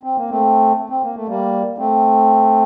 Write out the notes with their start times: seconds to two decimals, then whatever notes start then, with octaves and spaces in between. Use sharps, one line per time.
0.03 C4
0.17 A#3
0.30 A3 C4
0.90 C4
1.03 A#3
1.15 A3
1.28 G3 A#3
1.78 A3 C4